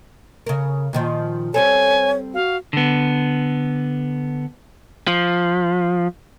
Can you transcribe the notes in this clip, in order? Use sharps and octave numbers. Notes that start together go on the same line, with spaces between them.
C#3 A#4
A#2 D#3 F3
G3 C4 A4 C#5 G#5
F#4 F5
D3 B3
F3